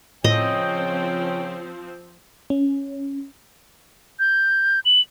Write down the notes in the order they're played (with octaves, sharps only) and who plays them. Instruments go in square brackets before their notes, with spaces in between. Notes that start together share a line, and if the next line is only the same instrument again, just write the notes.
[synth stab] A2 [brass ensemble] C#3 C#5 G5 [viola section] F3 C4 [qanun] D#5
[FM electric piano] C#4
[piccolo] G6
F#7